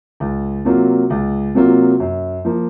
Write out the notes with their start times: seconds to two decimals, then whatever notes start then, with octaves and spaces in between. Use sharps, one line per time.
0.20 C#2
0.65 C3 F#3 A#3 F4
1.10 C#2
1.55 C3 F#3 A#3 F4
2.00 F#2
2.45 F3 A#3